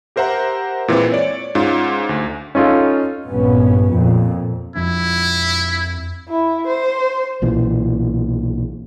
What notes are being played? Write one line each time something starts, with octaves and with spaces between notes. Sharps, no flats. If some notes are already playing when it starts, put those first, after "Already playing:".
G4 A#4 C5 E5 F#5 A#5
A#2 E3 G#3 C4
C#5 D5
G#2 C#4 F4
D2
C#4 D#4 F4 A4
A#1 G2 B3 C#4
F2 A#2
F2 F3 D4 E4
E4
C5
B1 A#2 E3